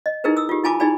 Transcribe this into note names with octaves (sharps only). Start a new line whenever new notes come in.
D#5
D#4 E4 G#4 A#4 B4
D#6 E6
F4 G4
E4 F4 G#5 A5 B5 D6
D#4 E4 G#4 D5 G#5 B5